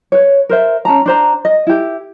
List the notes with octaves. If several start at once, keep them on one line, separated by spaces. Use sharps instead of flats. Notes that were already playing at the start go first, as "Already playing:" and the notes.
B4 C#5
A#4 C5 E5
C#4 D4 A5 A#5
D4 C5 A#5
D#5
E4 G4